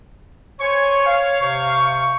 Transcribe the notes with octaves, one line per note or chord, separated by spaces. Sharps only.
C5 C#5 G#5 C#6
F5
C3 C5 C#6